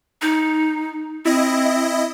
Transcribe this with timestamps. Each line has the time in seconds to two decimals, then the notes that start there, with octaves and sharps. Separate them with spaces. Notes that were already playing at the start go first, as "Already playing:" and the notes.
0.22 D#4
1.25 C4 E4 D#5